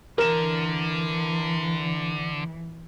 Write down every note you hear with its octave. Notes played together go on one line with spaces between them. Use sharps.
D3 E3 A#4 E7